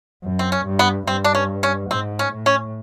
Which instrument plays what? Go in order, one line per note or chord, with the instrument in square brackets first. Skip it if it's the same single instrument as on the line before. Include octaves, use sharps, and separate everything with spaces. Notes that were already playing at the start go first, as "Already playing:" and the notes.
[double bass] F#2
[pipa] C4
C#4
[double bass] G2
[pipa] B3
[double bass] G2 [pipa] C4
[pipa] D4
C#4
C#4
[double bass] G#2 [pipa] C4
[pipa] C#4
[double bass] A2
[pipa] C#4